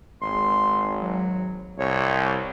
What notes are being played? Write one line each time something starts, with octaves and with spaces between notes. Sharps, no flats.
G#1 C6
F#3
C2 C#5